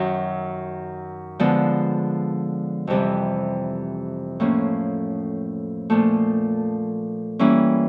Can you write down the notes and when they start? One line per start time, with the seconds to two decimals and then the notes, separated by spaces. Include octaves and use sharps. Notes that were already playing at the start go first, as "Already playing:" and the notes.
Already playing: F#2 D#3 F#3
1.39 D3 F3 G#3 B3
2.87 F2 C3 E3 G3
4.40 A2 F3 A#3 C#4
5.90 A#2 F3 A3
7.39 E3 G3 A#3 C#4 E4